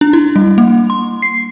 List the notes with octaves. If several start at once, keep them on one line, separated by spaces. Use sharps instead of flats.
D4
E4
G3
A#3
C6
C7